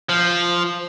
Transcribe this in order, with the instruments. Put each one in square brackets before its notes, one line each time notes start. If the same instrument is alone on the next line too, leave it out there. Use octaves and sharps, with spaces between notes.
[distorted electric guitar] F3